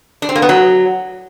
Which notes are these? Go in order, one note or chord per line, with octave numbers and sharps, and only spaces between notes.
D4
C4
A#3
B3
F#3